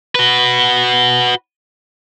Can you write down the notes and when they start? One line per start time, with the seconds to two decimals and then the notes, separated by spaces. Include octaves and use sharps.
0.15 F#4 B4